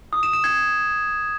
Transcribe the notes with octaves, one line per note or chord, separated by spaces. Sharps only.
D#6
E7
E7
G#6